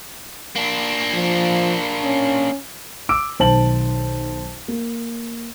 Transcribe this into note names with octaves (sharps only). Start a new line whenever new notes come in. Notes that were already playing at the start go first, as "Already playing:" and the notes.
A#3 D4
F3
C#4
D6 E6 D7
B1 D#3 C5 A5 F#7
A#3